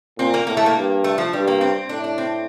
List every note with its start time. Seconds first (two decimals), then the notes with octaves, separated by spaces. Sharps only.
0.19 A#2 C4
0.34 A#3
0.47 A2 A#3
0.57 A3
0.66 A#3
0.76 G2
1.04 A3
1.18 F3
1.33 G2 G3
1.47 A#3
1.61 C4
1.89 A2 D4
2.04 D4
2.18 C4